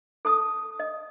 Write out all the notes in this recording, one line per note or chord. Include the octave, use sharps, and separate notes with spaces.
A4 A5 D#6
D#5